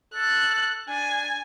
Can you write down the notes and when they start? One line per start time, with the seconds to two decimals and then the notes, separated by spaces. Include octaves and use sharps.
0.14 A4 F#6
0.89 D4 G#5